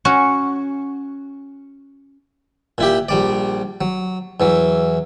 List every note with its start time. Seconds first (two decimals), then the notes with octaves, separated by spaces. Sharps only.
0.05 C#4 F#4
2.78 A#2 E4 G4
3.09 A#1 G3 D5
3.81 F#3
4.40 E2 E3 F#3